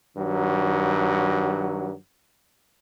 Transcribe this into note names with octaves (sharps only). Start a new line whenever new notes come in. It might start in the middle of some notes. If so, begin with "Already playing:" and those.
G2 D#3 F#3